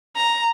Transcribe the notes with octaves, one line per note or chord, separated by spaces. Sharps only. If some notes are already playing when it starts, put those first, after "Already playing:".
A#5